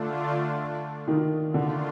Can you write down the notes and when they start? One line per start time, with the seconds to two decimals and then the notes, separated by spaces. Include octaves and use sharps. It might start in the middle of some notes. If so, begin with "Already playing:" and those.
Already playing: D3 A3 D4 F4
1.08 D#3
1.54 D3 D#3 A3 D4 F4